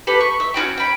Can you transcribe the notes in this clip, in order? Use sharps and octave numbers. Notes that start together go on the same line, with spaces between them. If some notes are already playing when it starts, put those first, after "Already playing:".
G4 A4 B4
C#6
E5
C#4 F4 F#4 G5
G5 B5